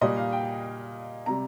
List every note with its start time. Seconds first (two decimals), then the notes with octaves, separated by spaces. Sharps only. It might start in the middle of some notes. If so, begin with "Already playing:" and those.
0.01 A#2 G3 D#5
0.16 F5
0.32 G5
1.26 C3 G3 A#5